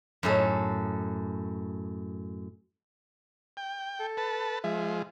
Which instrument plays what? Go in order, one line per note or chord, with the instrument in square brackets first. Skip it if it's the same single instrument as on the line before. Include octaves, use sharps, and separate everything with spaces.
[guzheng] F#2 A2 A4
[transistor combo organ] G5
[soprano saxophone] A4
[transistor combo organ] B4 A5
[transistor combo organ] F3 G#3 [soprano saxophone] E5